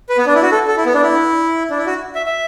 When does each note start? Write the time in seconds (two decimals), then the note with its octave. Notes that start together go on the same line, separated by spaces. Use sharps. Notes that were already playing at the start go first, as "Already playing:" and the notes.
0.09 B4
0.18 B3
0.26 D4
0.35 E4
0.42 F#4
0.52 A4
0.68 A4
0.77 E4
0.86 B3
0.94 D4
1.02 E4
1.70 D4
1.78 E4
1.86 F#4
2.15 E5
2.26 E5